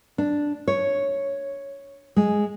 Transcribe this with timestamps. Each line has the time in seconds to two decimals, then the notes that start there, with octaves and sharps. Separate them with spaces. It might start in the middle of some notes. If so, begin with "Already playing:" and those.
0.18 D4
0.68 C#5
2.16 G#3